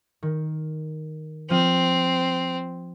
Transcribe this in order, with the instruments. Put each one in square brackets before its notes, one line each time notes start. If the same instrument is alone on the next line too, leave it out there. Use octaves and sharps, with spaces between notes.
[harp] D#3
[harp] F3 F6 D#7 [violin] C4